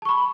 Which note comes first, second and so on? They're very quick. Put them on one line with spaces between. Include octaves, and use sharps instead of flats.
A5 C#6 B5